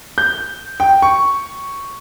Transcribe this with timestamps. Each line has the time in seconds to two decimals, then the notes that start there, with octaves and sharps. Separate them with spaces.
0.18 G6
0.80 G5
1.02 C#6